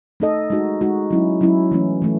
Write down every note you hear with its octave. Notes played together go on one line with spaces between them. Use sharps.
A3 D#4 A4 D#5
G#3 D#4 F#4
G#3 D#4 F#4
F#3 C#4 E4
F#3 C#4 E4
E3 A3 C#4
E3 A3